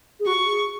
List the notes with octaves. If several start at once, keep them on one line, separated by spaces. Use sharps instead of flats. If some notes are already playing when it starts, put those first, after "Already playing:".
G#4
F#4 C#6
G#4